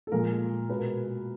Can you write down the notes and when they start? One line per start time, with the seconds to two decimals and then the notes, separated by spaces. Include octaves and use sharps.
0.07 A4
0.12 A#2 F3 G#3 A#4
0.70 B2 G#3 B4
0.79 A#4